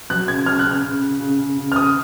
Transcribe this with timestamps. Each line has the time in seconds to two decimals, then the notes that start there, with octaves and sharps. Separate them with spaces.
0.10 F#3 F#6
0.28 C#3 G#6
0.46 C#3 F6
0.59 F#6
0.65 C#3
0.71 F6
0.83 C#3
1.01 C#3
1.20 C#3
1.39 C#3
1.57 C#3
1.72 F6
1.76 C#3 D#6